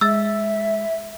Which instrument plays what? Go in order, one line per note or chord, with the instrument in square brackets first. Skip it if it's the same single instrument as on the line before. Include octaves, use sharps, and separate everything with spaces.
[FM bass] G#3 [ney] E5 [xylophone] E6 A6